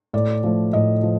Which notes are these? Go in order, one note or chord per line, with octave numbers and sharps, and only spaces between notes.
A2 D5
F3 A3
A2 D#5
F3